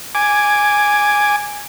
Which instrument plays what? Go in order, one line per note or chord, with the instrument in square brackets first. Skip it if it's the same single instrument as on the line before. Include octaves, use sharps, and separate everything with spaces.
[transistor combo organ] G#5 D6